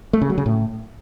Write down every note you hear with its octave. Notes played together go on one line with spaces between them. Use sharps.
A3
C#3
F#3
C#3
A2